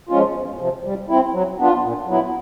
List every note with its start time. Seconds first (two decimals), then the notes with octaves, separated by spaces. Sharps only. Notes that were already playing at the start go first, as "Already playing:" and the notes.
0.09 F3 G#3 C#4 F4
0.35 E2
0.59 C3 F3
0.84 G3
1.08 C4 E4
1.33 F#3
1.58 B3 D4 F4
1.83 A#2
2.07 F#3 B3 E4